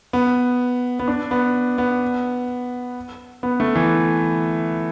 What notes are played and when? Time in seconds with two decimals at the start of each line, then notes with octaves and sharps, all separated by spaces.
0.13 B3
0.99 B3
1.08 D4
1.31 B3
1.78 B3
3.43 B3
3.60 A3
3.76 E3